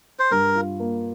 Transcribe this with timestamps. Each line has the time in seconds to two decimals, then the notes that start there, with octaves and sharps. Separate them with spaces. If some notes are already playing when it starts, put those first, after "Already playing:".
0.19 C5
0.31 G2 A#4
0.55 F4
0.80 A#3